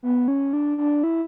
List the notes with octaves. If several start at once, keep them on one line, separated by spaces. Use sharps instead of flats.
B3
C#4
D4
D4
E4